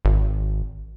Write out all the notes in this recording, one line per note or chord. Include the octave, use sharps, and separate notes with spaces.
G#1